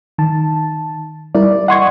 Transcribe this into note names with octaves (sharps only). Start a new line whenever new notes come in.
D#3 A5
G3 E4 A#4 D5
D#5 F#5 C6 C#6 D#6 G#6